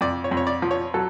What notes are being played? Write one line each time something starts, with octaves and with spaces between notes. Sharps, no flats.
F2 D5
C#5
F2
C#5
D5
F3
C#5
F#3 A4